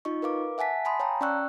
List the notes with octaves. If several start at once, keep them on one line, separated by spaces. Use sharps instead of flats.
D#4 F4 D#5 C#6
A#4 B4 F5 D6
E5 F#5 G#5 A5 B6
G#5 A5 B5 C6 D#6
C#5 F5 G5 A5 A#5
C#4 D5 G5 C#6 E6 F#6